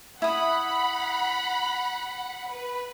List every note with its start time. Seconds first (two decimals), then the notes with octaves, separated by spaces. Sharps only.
0.22 E4 F#5 B5 D#6
2.51 B4